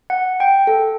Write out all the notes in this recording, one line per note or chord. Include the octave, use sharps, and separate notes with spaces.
F#5
G5
A4